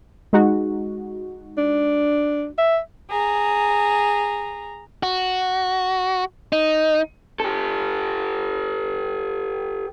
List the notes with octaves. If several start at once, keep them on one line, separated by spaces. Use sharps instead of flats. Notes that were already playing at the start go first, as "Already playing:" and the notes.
G#3 D#4 F#4
D4
E5
G#4 A#5
F#4
D#4
G4 A4